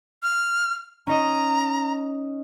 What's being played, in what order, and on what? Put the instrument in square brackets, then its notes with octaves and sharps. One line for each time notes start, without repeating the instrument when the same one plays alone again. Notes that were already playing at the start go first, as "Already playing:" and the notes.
[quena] F6
[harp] C#4 D#4 D#5 [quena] A#5